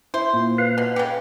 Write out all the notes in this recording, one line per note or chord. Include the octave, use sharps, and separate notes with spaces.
E4 C5
A#2
B4 F5
B2
C#3 G4 C#7